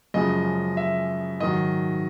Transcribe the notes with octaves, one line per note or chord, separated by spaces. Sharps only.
F#2 C#3 F3 G#3 D#5
E5
G#2 D#3 F#3 D#5